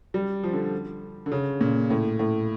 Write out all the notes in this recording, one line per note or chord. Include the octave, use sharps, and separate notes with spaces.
G3
F3
D3
D3
C#3
A#2
A2
A2